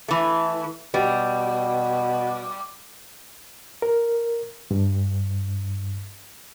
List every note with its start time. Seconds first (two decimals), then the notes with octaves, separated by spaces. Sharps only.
0.08 E3 A3
0.94 B2 G3
3.82 A#4
4.71 G2